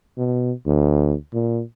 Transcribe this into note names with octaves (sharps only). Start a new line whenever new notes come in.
B2
D2
A#2